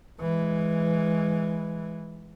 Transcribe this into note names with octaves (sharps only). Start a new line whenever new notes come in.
E3 G#3